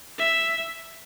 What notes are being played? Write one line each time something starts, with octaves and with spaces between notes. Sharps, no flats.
E5